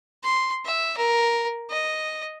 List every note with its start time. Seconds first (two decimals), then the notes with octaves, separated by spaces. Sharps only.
0.23 C6
0.65 E5
0.97 A#4
1.70 D#5